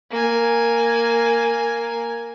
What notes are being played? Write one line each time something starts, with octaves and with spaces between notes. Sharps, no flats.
A#3 G#5